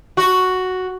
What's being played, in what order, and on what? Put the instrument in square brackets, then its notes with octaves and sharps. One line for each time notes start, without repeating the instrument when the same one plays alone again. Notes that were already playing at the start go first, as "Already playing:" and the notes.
[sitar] F#4